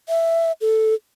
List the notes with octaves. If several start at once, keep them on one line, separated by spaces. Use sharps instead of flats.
E5
A4